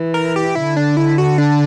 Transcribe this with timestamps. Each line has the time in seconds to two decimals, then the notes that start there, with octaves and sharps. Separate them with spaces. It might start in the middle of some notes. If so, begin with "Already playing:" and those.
Already playing: E3
0.14 A#4
0.36 G4
0.55 D3 E4
0.77 D4
0.97 E4
1.18 F#4
1.38 D4